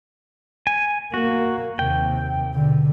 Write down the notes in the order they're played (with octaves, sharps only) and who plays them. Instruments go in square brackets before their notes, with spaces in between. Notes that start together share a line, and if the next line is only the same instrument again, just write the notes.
[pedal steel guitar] G#5
[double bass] A#3 [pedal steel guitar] F#4
[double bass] D#2 C3 [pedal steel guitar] G5
[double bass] B2 D3